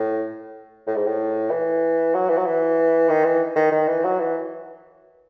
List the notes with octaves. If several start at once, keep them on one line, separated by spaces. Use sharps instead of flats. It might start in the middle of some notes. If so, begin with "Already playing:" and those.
Already playing: A2
A2
G#2
A2
E3
F#3
E3
F#3
E3
D#3
E3
D#3
D#3
E3
F#3
E3